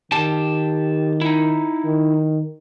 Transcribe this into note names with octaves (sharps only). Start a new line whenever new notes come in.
D#3 G4 A5
D#4 E4
D#3